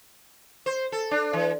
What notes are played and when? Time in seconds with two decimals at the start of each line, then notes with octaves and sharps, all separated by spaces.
0.66 C5
0.92 A4
1.11 D4
1.33 E3